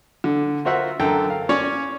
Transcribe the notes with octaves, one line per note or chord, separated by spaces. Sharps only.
D3
F4 F#4 A#4 C5 E5 F#5
F#2 D3 A4 G5 A#5
F5
C#4 C#5 D5